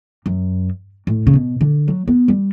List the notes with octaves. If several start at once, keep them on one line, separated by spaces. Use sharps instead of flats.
F#2
A2
C#3
B2
D3
F#3
B3
G3